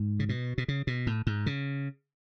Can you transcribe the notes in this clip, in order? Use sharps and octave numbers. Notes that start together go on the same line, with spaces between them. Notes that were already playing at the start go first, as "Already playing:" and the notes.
Already playing: G#2
C#3
B2
B2
C#3
B2
A2
G#2
C#3